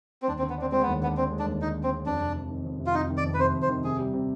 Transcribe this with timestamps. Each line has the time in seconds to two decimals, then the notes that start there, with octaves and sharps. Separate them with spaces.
0.22 C4
0.28 D#2 D4
0.38 C4
0.43 D3
0.50 B3
0.58 C4 D4
0.72 G#3 C4
0.82 D#2 B3
1.02 D3 B3
1.17 C4 D4
1.32 G#3
1.39 D4
1.46 D#2
1.62 D3 D#4
1.76 D4
1.83 C4
1.91 G#3
2.06 F2 D4
2.21 C3
2.36 F2
2.50 D#3
2.65 F2
2.80 C3
2.86 F4
2.94 F2 D#4
3.10 D#3
3.17 D5
3.25 F2
3.34 B4
3.39 C3 C5
3.54 F2
3.62 C5
3.69 D#3
3.84 C3 G#4
3.99 G3
4.13 C3